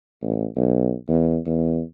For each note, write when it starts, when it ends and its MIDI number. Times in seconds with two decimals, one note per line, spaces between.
0.22 0.46 33
0.56 0.94 35
1.08 1.38 40
1.46 1.81 40